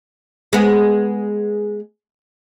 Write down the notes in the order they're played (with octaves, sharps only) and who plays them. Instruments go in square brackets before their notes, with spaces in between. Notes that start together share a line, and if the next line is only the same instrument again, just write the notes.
[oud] G#3 B3